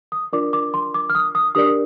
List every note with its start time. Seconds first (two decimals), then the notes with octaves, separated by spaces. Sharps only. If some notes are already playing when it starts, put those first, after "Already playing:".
0.12 D#6
0.33 D4 F4 A#4 D5 D6
0.53 D6
0.74 C6
0.94 D6
1.10 F6
1.15 D#6
1.35 D#6
1.55 D4 G4 A#4 D5 D#6